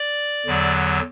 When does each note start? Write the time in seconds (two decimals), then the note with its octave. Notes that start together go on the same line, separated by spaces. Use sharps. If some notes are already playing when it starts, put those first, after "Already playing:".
Already playing: D5
0.46 E2 D3 F#3